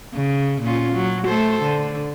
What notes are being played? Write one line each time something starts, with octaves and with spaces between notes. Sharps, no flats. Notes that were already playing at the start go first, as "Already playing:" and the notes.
C#3
A#2 C#4 F4
F#3
A3 A4 C5
D3